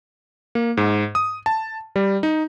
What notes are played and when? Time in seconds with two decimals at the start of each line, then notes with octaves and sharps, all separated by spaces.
0.55 A#3
0.77 G#2
1.15 D#6
1.46 A5
1.96 G3
2.23 D#4